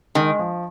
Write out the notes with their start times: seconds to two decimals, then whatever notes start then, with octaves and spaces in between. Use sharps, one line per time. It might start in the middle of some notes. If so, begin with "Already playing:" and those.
0.15 D#3 G#3
0.39 F3